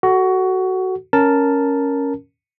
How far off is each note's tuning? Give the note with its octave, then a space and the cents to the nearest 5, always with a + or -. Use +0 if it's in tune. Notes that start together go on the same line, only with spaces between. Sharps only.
F#4 +15 A4 +0
C#4 +0 A#4 +0 A5 +0